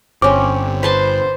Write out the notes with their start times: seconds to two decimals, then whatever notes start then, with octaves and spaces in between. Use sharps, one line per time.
0.22 G1 C4 C#4 D6
0.83 B4 C5 A5 C6